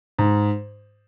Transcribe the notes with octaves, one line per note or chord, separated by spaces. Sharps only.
G#2